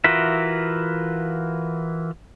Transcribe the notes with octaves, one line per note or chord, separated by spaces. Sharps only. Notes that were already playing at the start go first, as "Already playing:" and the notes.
E3 F4 F#4 A#4 E5